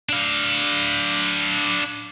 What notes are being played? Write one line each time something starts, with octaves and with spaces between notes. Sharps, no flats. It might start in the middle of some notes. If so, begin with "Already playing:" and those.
D4 F5